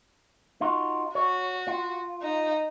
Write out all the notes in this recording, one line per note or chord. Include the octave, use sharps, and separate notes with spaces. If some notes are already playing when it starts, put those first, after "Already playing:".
D#4 F4 F#4
F#4 C#5
F4
D#4